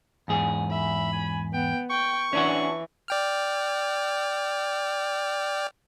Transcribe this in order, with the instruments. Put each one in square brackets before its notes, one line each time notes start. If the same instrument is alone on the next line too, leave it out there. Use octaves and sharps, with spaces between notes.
[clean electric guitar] E2 G#2 G#4
[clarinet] E5 [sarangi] B5
[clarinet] G#5
[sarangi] B3 [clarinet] G5
[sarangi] G5 [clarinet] C#6
[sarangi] E3 [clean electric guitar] C#4 D4 F#4
[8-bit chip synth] D5 G5 F6